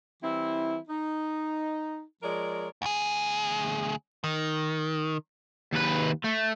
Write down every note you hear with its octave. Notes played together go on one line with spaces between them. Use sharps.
E3 G3 C4 E4
D#4
F3 G#3 A#4 C#5 D5
D2 G#4
D#3
D#2 B4
A3